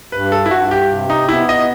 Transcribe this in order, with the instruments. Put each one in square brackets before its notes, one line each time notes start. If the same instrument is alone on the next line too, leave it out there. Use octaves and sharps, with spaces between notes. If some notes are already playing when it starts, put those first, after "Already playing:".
[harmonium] G2 [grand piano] B4
[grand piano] A4
E4
[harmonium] G2 [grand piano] F#4
[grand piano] G4
[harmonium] C3
[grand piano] D#4
[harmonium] B3 [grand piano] E4
[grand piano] D#5